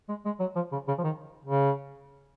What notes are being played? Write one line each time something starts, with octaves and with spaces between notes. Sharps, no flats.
G#3
G#3
F#3
F3
C#3
C#3
F3
D#3
C#3